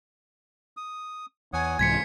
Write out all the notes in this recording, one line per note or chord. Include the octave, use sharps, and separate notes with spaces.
D#6
E2 C#5 F#5 G#5 D#6
C2 G#2 E3 F4 G#6 B6 C#7